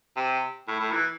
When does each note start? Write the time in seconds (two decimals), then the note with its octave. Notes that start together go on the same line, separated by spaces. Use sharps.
0.17 C3
0.68 A2
0.80 A2
0.93 E3